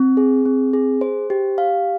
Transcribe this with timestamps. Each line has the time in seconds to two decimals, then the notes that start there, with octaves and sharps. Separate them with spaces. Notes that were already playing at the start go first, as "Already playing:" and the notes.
Already playing: C4
0.17 G#4
0.46 C4
0.73 G#4
1.01 C5
1.30 G4
1.58 F5